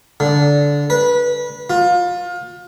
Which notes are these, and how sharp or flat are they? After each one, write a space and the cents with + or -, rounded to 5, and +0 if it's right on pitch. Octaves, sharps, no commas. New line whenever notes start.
D3 -15
B4 -25
F4 +25